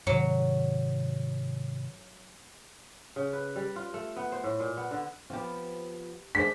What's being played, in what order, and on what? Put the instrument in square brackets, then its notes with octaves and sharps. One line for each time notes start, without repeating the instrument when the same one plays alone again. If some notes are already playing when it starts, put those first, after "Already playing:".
[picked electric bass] G#2 C3 D#3 [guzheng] F#3
[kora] C#3
B4
G3
F4
A3
B3
C5
A2
A#2
B3
D3
[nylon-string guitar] F3 B3 [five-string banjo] C4 G4
[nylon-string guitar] G#3 C#4 [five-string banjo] D4 G#4 C5 [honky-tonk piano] B6